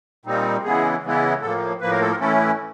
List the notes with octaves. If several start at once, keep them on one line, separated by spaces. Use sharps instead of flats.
A#2 G3 C4 D#4
C#3 E3 G#3 B3 E4 G#4
C#3 E3 G#3 B3 E4
A2 F3 A#3 A4
A2 F3 A#3 B4
A#4
A4
A#4
A2 E3 A3 C#4 E4 A4